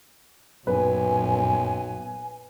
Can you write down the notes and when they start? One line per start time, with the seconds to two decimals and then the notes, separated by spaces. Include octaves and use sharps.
0.67 B1 F#2 A#2 B4 G#5